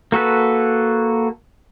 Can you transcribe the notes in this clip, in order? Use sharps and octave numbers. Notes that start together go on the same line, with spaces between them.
A#3 F#4 A4 B4